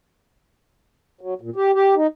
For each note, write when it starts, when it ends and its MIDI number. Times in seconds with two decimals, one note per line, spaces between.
1.21 1.34 54
1.41 1.50 46
1.56 1.71 67
1.74 1.95 67
1.96 2.07 63